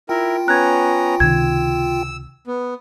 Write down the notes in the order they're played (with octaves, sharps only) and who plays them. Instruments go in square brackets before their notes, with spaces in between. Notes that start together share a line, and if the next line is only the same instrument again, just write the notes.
[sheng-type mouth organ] E4 A#4 [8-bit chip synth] F4 G5
[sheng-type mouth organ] B3 C#4 A#5 [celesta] F#6 G#6
[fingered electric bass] C#2 C3 D#3 [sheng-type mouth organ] E6 [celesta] G#6
[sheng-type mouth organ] B3